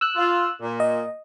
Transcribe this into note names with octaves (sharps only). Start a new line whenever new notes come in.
E6 F#6
F4
A#2
D#5